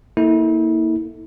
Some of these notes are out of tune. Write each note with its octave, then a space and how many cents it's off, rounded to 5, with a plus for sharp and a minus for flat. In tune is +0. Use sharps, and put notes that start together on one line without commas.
A#3 +0 E4 -35 A4 +0